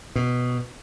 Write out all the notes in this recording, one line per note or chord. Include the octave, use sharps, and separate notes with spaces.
B2